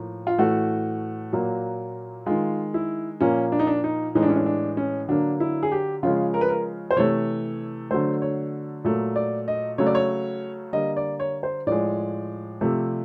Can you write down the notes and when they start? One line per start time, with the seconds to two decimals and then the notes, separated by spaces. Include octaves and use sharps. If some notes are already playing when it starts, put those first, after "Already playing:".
Already playing: A2 F3 A#3
0.27 F4
0.38 A2 E3 A3 F#4
1.33 A#2 F#3 A#3
2.26 D#3 G#3 F4
2.74 E4
3.21 A#2 F3 A#3 C#4
3.52 D4
3.59 D#4
3.67 D4
3.84 D#4
4.15 A2 E3 G#3 D#4
4.23 D4
4.29 C#4
4.36 D4
4.46 D4
4.77 C#4
5.09 D3 F#3 A#3 D4
5.40 E4
5.63 G#4
5.72 G4
6.03 C#3 F3 G#3 F4
6.34 A#4
6.41 B4
6.49 A#4
6.91 C5
6.97 C3 E3 A3 C#5
7.91 D3 F#3 A3 C5
8.22 C#5
8.85 A#2 F#3 A3
9.16 D5
9.48 D#5
9.78 C#3 F#3 A3 C#5
9.87 D5
9.95 C#5
10.73 D3 G3 A#3 D#5
10.97 D5
11.20 C#5
11.43 C5
11.67 A2 F3 G#3 D5
12.61 C3 F3 A3